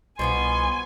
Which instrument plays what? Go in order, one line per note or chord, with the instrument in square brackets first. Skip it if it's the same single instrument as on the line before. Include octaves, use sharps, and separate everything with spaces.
[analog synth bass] C2 [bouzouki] B2 F3 B3 [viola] G#5 [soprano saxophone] C6